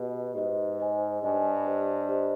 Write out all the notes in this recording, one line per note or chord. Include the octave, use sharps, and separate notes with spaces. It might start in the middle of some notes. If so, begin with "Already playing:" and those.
Already playing: B2 G4 B4 D#5
G#2 G4 B4 D#5
C5 D#5 G#5
G2 C5 D#5 G#5
G4 C5 D#5
G4 C5 D#5